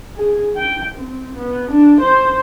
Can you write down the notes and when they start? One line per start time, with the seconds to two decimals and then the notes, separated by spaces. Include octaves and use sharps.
0.17 G#4
0.56 G5
0.95 C4
1.37 B3
1.72 D4
2.01 C5